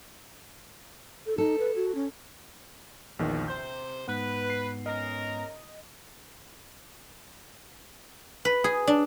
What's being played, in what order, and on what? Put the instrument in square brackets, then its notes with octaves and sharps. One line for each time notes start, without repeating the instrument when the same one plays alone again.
[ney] A4
[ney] D#4 [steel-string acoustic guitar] A4
[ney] B4
F#4
C#4
[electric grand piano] A#1 E2 D#3
[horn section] C3 C5 [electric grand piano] G6
[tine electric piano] G#2 B3 [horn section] B4
[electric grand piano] C7
[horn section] C#4 A#4 [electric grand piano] D#5
[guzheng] B4
G#4
D4